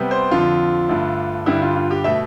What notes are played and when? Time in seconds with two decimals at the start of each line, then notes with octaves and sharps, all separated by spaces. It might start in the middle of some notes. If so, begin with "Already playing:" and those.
Already playing: C3 G3 B3
0.11 C5
0.31 F2 D3 F3 F4
0.89 G2 D3 A3
1.46 G2 D3 G3 E4
1.62 F4
1.76 F4
1.91 G4
2.04 B2 A3 E5